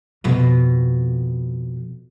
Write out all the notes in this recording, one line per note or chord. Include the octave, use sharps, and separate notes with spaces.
F2 B2